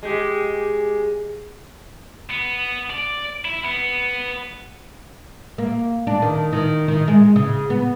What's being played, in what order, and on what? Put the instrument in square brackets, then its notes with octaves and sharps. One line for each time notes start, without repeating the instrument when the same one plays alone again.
[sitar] G#3 G4
[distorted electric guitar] B3
D5
E4
B3
[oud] A#3
D4
D#3
D#3
D#3
G#3
C#3
B3